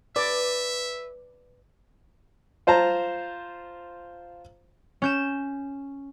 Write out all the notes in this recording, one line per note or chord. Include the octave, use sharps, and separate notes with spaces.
B4 D5 E5
F4 C5 A5 A#5
C#4 G6 E7